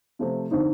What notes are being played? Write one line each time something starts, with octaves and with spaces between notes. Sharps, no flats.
C3 F3 A3 C4
D3 F3 C4 D#4